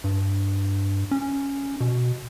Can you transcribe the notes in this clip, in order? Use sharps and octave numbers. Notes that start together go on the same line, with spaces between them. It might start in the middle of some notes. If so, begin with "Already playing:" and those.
G2
C#4
B2